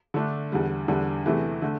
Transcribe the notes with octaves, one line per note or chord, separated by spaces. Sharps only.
D3 A3 D4
E2 D3 G3
E2 D3 G3 D4
E2 C3 E3 A3
D3 A3